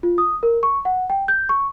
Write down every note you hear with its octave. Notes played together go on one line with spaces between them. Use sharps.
F4
D#6
A#4
C#6
F#5
G5
G6
C#6